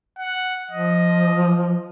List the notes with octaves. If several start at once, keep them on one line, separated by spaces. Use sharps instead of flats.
F#5
F3 D#5